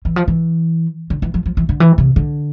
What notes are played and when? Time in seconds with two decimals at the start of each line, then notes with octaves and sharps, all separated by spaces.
0.05 E3
0.16 F3
0.28 E3
1.10 D3
1.22 E3
1.34 F3
1.46 F3
1.57 E3
1.69 D3
1.80 E3
1.98 C3
2.16 D3